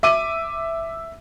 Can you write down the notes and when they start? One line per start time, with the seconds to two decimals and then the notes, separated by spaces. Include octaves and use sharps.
0.03 E5 D6 D#7